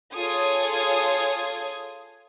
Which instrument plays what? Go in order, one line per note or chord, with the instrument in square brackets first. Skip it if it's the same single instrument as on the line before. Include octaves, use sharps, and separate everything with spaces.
[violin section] F4 G#4 A4 C#5 D#6 G#6